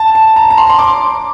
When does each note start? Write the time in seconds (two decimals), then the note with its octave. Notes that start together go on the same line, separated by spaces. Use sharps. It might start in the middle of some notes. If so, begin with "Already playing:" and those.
Already playing: A5
0.15 A5
0.36 A#5
0.50 A#5
0.58 C6
0.69 C6
0.79 D6